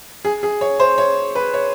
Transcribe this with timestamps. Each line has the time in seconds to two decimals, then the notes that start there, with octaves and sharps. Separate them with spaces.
0.25 G#4
0.43 G#4
0.61 C#5
0.80 C5
0.98 C#5
1.35 B4
1.54 C#5